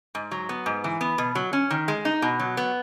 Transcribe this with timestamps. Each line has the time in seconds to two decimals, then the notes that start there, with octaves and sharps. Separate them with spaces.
0.15 G#2
0.31 F#3
0.49 B3
0.66 G#2
0.84 E3
1.01 B3
1.18 B2
1.35 F#3
1.53 C#4
1.70 D#3
1.88 G#3
2.05 D#4
2.22 B2
2.40 F#3
2.57 B3